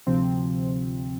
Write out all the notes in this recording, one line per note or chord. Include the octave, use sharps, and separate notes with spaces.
D2 C3 F3 C4